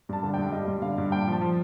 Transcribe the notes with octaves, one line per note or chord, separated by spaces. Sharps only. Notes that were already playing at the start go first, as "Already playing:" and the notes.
G2 A5
D3
G2 G5
G3 D#5
G2
D3 F5
G2
A#2 G5
F3
A5
F3